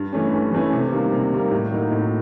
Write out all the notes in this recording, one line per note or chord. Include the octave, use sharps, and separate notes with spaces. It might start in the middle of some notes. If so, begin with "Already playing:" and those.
Already playing: G2
E3 A3 C#4
G2
E3 A3 C#4
C3
D#3 G3 A#3
C3
D#3 G3 A#3
A2
F#3 A#3 D#4
A2